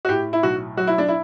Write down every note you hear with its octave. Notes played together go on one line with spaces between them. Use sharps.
F#4
A2 G4
E4
B1 F#4
F#3 F#4
E4
D4
E4